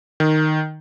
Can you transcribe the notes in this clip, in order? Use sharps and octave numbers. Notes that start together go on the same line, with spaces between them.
D#3